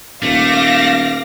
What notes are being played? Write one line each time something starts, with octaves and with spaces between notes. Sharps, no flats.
D#1 A3 F5 D6 A#6